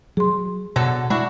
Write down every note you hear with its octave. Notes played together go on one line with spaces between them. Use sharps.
F#3 G#4 C6
B2 D3 F#3 A4
G#3 D4 E4 F#4